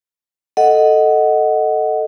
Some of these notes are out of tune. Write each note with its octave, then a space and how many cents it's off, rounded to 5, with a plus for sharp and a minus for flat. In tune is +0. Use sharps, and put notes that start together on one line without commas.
A4 +0 D#5 +0 F#5 +0